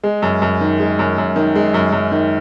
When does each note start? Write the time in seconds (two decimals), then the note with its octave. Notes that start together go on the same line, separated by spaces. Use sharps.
0.03 G#3
0.22 F#2
0.42 F#2
0.61 D#3
0.80 G#3
0.99 F#2
1.18 F#2
1.36 D#3
1.56 G#3
1.74 F#2
1.92 F#2
2.12 D#3